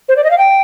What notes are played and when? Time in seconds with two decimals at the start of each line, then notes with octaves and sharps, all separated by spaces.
0.09 C5
0.17 D5
0.24 D#5
0.31 F5
0.38 G5